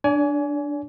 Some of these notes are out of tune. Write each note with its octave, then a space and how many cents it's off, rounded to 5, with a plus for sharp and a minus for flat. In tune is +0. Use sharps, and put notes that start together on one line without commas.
D4 +0 D5 -40 G#5 +15